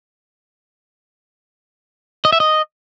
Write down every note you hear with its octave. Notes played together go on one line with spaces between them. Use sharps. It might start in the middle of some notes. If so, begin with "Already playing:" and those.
D#5
E5
D#5